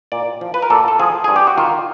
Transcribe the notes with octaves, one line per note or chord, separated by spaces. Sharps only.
A#2 D5
F3
B4
A#4
A#2 A4
A4
F3 G#4
G2 G#4
G4
F#4
D#3 F4